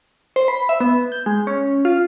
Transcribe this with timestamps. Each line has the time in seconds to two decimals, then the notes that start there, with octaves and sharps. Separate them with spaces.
0.36 C5
0.48 B5
0.69 E5
0.80 B3
1.12 G6
1.26 G#3
1.47 C#4
1.85 F4